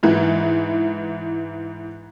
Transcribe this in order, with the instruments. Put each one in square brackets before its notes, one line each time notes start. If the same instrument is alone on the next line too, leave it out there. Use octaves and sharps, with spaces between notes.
[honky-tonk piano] G#2 E3